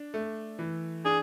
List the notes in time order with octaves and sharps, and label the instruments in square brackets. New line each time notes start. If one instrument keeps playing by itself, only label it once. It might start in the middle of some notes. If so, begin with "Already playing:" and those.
Already playing: [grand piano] D4
A3
E3
[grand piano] D4 [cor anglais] G#4